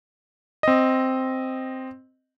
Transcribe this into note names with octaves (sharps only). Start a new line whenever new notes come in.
C4 D#5